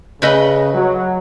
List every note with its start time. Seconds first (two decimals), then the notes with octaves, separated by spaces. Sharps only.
0.22 C#3 A3 B4 D#5
0.75 F#3